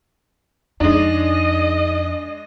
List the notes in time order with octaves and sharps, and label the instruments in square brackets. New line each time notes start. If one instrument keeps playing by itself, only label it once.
[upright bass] F2 [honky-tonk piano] G#3 D4 [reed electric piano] D#4 [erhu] D#5